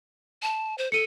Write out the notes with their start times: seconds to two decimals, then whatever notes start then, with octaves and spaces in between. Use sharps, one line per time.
0.42 A5
0.78 C5
0.92 A4 C#7 D#7